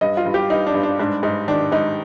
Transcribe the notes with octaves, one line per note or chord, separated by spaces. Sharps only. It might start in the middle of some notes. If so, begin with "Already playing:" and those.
G2 D#5
F4
G2
G4
G2 D#4
D4
G2
D4
G#2 D4
G#2 D#4
D#3 D4
G#2 D#4